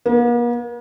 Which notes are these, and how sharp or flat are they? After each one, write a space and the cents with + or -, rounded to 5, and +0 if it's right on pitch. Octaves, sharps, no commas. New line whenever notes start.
A#3 +45